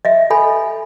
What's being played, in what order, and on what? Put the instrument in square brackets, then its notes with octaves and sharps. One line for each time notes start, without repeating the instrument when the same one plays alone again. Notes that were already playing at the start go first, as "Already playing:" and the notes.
[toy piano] D#5 E5
A4 G#5 B5